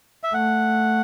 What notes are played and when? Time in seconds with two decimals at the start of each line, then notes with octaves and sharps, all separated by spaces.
0.24 E5
0.34 A3 F#5